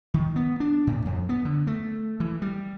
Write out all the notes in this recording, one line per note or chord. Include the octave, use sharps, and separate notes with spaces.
D#3
B3
D4
A2
F2
B3
D3
A3
E3
G3